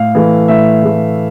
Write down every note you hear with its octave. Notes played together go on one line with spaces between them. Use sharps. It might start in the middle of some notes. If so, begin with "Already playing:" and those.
Already playing: A2 F5
E3 A3
A2 E5
E3 A3